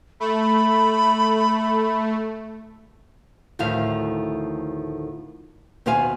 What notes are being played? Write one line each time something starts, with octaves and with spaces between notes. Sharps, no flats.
A3 B5
D2 A2 D#3 F3 F5
D#2 B2 B3 C5 F5 G#5